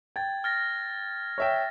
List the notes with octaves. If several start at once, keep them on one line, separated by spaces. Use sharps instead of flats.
G5 G#6 A6
F6 A6 A#6
C#5 E5 G5